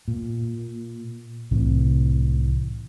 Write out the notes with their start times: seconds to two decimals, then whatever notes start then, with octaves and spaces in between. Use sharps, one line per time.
0.08 A#2
1.51 C2 A2 C3 E3